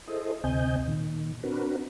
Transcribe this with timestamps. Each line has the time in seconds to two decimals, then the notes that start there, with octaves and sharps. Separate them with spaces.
0.07 E4 G#4 A4 C5 D#5
0.44 D2 C3 C4 D#5 G#5 G6
0.88 A#2 D#3
1.43 C4 D4 F#4 A#4 B4